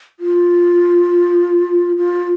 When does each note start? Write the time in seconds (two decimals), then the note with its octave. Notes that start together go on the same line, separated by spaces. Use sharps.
0.20 F4
1.97 F4